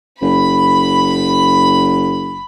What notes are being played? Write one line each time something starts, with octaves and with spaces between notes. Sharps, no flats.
F#1 B5